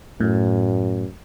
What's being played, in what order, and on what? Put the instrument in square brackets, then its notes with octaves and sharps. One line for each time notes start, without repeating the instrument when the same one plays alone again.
[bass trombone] F#2 [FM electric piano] A2